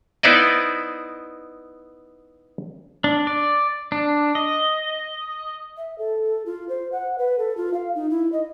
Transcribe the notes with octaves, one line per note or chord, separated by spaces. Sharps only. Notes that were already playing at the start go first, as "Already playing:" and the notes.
B3 D#4 E4 C5 D5 D#5
D4
D5
D4
D#5
E5
A4
F4
C5
F#5
B4
A4
F4
F5
D#4
E4
D#5